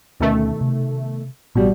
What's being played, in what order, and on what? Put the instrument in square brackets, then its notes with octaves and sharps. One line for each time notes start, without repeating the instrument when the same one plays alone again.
[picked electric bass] D2 C#4 [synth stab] B2 D#3 A3
[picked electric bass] C3
[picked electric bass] A1 [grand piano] B2 G3